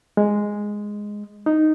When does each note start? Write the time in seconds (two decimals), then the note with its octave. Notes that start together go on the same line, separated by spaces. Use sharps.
0.17 G#3
1.46 D#4